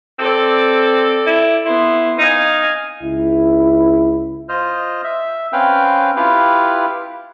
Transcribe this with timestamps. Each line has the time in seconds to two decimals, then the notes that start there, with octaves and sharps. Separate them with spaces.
0.19 C4 A4 D5
1.27 E4
1.66 B3 E4 C6
2.19 D#4 F5 G#5
3.02 C#2 E4
4.49 F4 C5 D#5 F6
5.04 E5
5.53 C4 C#4 B4 F5 G5
6.16 E4 F4 G4 B4 F5